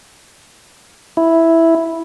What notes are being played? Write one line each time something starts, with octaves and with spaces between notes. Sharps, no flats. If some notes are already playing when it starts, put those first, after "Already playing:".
E4